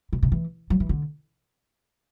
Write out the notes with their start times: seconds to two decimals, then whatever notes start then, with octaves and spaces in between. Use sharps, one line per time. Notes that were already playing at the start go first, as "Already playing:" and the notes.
0.13 B2
0.23 C3
0.32 E3
0.70 F#3
0.80 E3
0.89 D3